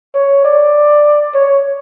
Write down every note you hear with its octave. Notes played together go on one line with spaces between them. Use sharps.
C#5
D5
C#5